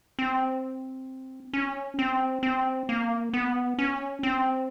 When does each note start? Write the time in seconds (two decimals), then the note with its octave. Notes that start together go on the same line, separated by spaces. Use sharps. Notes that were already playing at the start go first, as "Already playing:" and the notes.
0.19 C4
1.53 C#4
1.99 C4
2.43 C4
2.89 A#3
3.34 B3
3.79 C#4
4.23 C4